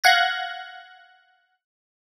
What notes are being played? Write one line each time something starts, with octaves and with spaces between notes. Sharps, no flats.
F5 F#5 F#6 G#6 A#6